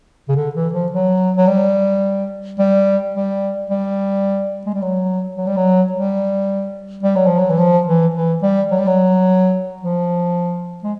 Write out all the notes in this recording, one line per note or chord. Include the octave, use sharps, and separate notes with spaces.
C#3
D3
E3
F3
F#3
F#3
G3
G3
G3
G3
G#3
G3
F#3
F#3
G3
F#3
G3
G3
F#3
F3
F#3
E3
F3
E3
E3
G3
F#3
G3
F#3
F3
G#3